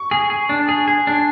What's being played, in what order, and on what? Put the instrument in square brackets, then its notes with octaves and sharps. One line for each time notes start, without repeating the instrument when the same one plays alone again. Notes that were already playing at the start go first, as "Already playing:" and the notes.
Already playing: [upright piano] C#6
[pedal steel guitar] G#4
G#4
D4
G#4
G#4
D4